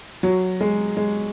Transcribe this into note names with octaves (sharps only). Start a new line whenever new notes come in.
F#3
G#3
G#3